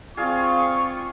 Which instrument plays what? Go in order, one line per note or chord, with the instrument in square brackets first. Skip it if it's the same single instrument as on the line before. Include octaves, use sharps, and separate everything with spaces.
[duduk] C4 [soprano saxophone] F4 [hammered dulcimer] G#4 D5 F5 [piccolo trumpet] C#6